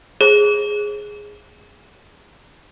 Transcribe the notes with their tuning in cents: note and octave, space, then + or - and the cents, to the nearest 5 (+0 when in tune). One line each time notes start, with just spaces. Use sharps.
G#4 +0 C5 +45